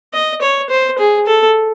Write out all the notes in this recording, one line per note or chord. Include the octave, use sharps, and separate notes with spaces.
D#5
C#5
C5
G#4
A4